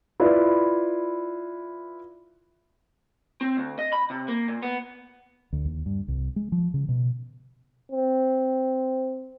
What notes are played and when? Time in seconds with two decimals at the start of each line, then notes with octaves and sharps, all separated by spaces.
0.20 E4 F4 B4 D5
3.41 C4
3.57 D2
3.79 D#5
3.93 B5
4.10 C3
4.28 A#3
4.48 A#2
4.63 B3
5.53 D2
5.65 D#2
5.86 G2
6.08 C2
6.36 G#3
6.52 F3
6.74 C#3
6.89 B2
7.92 C4